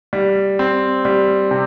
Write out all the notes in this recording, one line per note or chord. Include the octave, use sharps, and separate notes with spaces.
G3
C4
G3
C3